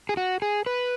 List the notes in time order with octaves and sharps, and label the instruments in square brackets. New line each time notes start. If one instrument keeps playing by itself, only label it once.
[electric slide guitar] G#4
F#4
G#4
B4